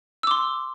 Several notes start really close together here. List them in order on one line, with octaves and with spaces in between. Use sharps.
E6 D6 C6